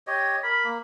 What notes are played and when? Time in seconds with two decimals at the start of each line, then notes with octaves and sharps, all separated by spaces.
0.07 G4 C#5 D#5
0.43 A#4 B5
0.64 A#3